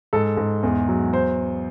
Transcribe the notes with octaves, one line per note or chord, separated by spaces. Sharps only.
G#2 A4
G#2
E2
F#3
C5